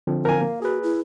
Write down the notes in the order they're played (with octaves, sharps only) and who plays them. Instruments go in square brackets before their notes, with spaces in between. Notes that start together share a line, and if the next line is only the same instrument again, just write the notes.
[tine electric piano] D3 F3 C4
[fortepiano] A#4 G#5 [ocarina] F5
[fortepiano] A#3
[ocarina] F#4 [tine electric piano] G#4 B4
[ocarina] E4